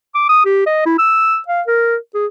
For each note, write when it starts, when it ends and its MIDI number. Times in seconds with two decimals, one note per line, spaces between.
0.15 0.28 86
0.29 0.41 87
0.45 0.64 67
0.66 0.83 75
0.86 0.95 64
0.99 1.39 88
1.48 1.62 77
1.67 1.96 70
2.15 2.26 68